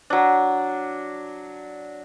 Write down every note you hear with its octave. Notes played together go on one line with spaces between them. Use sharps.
F#3 D4